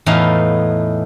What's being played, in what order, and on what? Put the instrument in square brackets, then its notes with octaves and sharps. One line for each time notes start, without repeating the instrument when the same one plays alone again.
[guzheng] E2 A2 A3 B3 D#4 F5